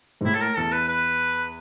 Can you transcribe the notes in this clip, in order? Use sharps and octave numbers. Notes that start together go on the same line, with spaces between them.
G#2
A2 E4
A4
A#4
E2 A4
B4
B4